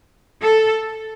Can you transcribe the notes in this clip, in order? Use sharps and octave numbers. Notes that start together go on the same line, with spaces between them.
A4